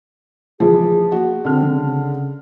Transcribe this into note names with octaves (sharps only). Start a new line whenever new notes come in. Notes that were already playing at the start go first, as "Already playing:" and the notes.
E3 F3 G#4
A#3 F#4
D3 C4 F6
C#3